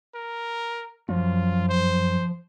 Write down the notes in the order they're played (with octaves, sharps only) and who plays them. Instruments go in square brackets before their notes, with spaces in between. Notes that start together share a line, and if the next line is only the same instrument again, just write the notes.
[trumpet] A#4
[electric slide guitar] F#2 [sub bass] F3 [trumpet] F4
[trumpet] C5